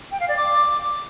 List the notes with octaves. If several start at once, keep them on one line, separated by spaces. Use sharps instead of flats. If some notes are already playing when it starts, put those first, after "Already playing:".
G5
F5
D5
D6